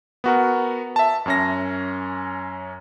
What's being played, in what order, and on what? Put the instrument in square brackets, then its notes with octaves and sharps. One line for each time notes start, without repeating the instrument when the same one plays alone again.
[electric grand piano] B3 F#4 A#4
E5 A5
F#2 C#4 A#6